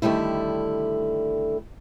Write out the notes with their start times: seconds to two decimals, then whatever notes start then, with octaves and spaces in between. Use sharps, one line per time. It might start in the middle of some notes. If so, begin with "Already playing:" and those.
0.02 D3 D#3 G3 A3 E4